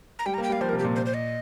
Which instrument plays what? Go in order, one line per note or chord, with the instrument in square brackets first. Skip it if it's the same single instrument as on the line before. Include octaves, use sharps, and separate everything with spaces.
[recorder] A#5
[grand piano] G3 [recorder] G5
[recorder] A#5
[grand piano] A#3
[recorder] G5
[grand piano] G3 [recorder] F5
[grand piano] F3 [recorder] C5
[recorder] A#4
[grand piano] C3
[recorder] G4
[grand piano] A#2
[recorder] C5
C5
D#5